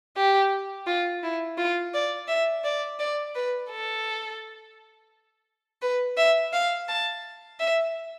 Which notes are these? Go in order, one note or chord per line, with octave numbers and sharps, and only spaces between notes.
G4
F4
E4
F4
D5
E5
D5
D5
B4
A4
B4
E5
F5
A5
E5